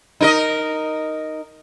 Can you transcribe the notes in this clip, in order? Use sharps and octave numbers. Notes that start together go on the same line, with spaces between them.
D#4 A#4 D#5